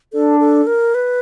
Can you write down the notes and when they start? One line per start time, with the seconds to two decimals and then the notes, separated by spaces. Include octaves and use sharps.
0.13 D4 A4
0.40 A4
0.67 A#4
0.94 B4